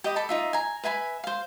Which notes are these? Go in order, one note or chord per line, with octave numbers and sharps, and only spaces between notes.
G4 D#5 B5
A4 A5 B5 D6
D#4 F4 E5
G#5 A#5
B4 E5 G#5 B5
C5 F5